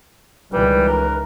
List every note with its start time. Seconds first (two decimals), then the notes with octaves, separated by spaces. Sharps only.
0.53 C#2 D#3 E3 G3 B4
0.88 A#4